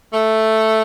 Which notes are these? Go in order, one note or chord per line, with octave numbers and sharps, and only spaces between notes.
A3